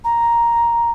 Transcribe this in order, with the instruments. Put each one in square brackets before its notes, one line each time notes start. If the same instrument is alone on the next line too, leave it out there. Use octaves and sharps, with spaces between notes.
[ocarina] A#5